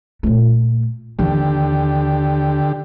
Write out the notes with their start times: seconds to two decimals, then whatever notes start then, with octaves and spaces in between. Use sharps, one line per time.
0.23 A#2 A3
1.19 D#2 D3 E3 G4